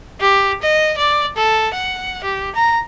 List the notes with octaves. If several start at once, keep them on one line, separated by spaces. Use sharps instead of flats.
G4
D#5
D5
A4
F#5
G4
A#5